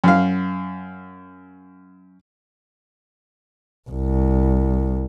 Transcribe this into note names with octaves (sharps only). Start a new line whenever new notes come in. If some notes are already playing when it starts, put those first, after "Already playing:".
F#2 F5
C2